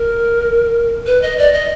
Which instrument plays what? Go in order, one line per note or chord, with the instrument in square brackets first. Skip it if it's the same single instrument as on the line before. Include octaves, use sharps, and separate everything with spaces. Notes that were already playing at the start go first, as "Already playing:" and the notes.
Already playing: [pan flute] A#4
B4
D#5
D5
D#5